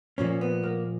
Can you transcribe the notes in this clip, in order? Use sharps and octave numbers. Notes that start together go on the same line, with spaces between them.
A#2 F3 A#3 C#4
B3
A#3